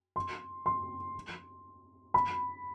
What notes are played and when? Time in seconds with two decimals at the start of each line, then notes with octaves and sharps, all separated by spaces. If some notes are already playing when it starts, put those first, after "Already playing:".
0.16 C6
0.66 C6
2.14 B5